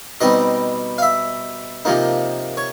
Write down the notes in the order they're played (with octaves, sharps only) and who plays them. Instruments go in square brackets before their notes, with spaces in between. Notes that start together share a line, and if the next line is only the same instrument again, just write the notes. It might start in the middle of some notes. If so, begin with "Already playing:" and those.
[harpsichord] B2 G3 C4 D#4 D#5
F5
E5
C3 F3 A#3 D#4
C#5